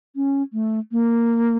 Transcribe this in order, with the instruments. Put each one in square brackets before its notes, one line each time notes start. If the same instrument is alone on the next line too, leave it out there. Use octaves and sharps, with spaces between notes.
[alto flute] C#4
A3
A#3